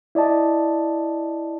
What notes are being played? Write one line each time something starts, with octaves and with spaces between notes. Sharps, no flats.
E4 D5 D#5 A5